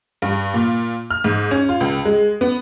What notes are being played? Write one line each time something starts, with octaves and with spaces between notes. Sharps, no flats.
G2
A#2
F6
G#2
C#4
F4
C#2
G#3
B3